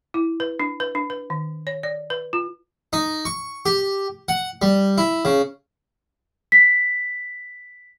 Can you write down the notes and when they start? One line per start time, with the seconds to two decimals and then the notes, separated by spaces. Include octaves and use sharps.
0.14 E4
0.40 B4
0.60 D4
0.80 B4
0.95 D4
1.10 B4
1.30 D#3
1.67 C#5
1.83 D5
2.10 B4
2.33 F4
2.93 D#4
3.25 C#6
3.66 G4
4.28 F#5
4.62 G3
4.98 E4
5.25 C#3
6.52 B6